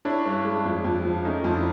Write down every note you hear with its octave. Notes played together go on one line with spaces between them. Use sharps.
C#4 D4 E4
G2
G#3
F2
F2
F3
A3 C#4 D#4
F2 F4
D4 E4